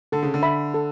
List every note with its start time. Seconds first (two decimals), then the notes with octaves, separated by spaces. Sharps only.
0.12 D3 A4
0.23 C#3
0.34 D3
0.43 E5 B5
0.74 A4